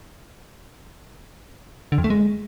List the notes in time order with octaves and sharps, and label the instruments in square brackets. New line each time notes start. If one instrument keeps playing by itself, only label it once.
[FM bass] D3
F2
A3
G#3